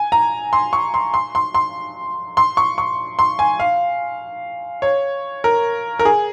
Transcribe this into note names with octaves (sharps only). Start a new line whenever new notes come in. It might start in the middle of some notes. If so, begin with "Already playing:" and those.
Already playing: G#5
A#5
C6
C#6
C6
C6
C6
C6
C6
C#6
C#6
C6
G#5
F5
C#5
A#4
A#4
G#4